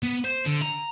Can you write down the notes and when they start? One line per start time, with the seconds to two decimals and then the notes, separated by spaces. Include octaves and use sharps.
0.03 B3
0.25 C5
0.45 D3
0.62 A#5